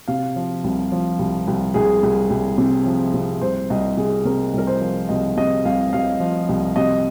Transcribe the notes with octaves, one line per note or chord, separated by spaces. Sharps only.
C3 F5
F3
C2
F3
C2
C2
C2 G#4
C2
C2
C3
F3
C3
C2 C5
C2 D#5
C3 G#4
C3 A#4
C2 A#4
C5
F3
C2 D#5
C3 D#5
C2 F5
C2 F5
F3
C2
C3 D#5